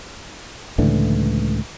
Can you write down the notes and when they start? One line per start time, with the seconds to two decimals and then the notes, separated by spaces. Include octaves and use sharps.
0.78 C#2 A2 D3 E3